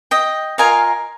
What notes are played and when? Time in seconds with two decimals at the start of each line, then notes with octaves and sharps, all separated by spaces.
0.11 D#5 G5
0.58 F4 A#4 D#5 F5 G#5